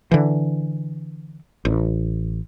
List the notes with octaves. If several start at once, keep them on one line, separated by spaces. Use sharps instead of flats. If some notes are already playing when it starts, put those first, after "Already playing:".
D3 E3
A1